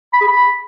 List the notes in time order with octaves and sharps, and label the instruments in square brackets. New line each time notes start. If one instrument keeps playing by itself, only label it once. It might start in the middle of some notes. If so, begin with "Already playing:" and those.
[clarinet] B5
G#4
B5